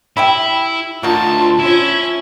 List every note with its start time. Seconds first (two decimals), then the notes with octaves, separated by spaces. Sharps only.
0.17 E4 G4 E5 B5
1.03 D2 A#3 D#4 F4 F#4 A5
1.59 C#4 E4 E5